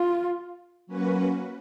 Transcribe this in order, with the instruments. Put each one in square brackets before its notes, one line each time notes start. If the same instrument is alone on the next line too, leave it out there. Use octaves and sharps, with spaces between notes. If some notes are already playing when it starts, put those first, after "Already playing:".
Already playing: [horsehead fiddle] F4
[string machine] F#3 A#3 C#4 F#4 B4